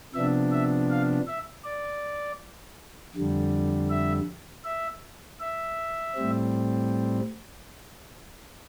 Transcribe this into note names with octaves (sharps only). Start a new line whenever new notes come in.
C3 F3 B3 D4 E5
E5
F5
E5
D5
F2 D3 G3
E5
E5
E5
A2 G3 C4